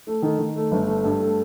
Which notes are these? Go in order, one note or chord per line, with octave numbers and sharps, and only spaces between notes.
A3
D#3
D#3
A3
G1
A3
G2
A3